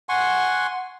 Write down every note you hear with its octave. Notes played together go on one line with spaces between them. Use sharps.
F#5 G#5 C6 C#6